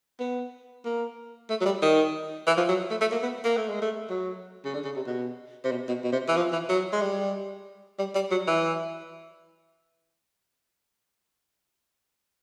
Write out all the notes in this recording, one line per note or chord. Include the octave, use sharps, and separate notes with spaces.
B3
A#3
A3
F#3
G3
D#3
E3
F3
F#3
A3
A3
A#3
B3
A#3
A3
G#3
A3
F#3
C#3
D3
C#3
C3
B2
C3
B2
B2
B2
C3
E3
F3
E3
F#3
G#3
G3
G3
G3
F#3
E3